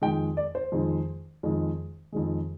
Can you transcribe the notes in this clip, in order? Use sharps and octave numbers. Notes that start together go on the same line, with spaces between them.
F2 D#3 G#3 G5
D5
C5
F2 D#3 G#3
F2 D#3 G#3
F2 D#3 G#3